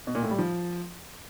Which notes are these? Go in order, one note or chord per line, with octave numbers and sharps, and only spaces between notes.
B2
A#2
A2
G3
F3